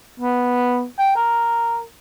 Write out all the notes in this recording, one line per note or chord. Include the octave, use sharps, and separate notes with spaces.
B3
G5
A#4